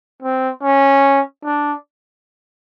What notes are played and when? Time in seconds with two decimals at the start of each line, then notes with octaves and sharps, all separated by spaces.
0.23 C4
0.63 C#4
1.45 D4